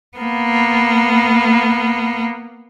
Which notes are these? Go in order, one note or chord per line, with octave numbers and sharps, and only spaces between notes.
A#3 B3